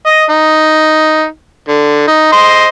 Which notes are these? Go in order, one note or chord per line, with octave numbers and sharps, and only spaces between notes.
D#5
D#4
D3
D#4
C5 D#5